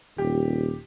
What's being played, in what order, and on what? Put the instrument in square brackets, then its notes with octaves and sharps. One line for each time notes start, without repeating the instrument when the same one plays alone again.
[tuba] D#1 [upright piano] G4